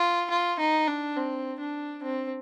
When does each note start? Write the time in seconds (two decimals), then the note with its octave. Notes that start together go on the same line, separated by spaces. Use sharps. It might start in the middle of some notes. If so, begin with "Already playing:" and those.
Already playing: F4
0.30 F4
0.59 D#4
0.88 D4
1.16 C4
1.60 D4
2.03 C4